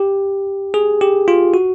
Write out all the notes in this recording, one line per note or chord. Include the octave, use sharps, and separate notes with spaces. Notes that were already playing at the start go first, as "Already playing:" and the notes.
Already playing: G4
G#4
G4
F4
F#4